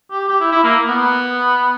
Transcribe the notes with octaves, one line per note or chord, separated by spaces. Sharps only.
G4
G4
E4
E4
A#3
B3